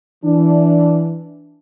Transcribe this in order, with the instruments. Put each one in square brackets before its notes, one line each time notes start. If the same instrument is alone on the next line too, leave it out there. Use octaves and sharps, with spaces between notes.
[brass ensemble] E3 D4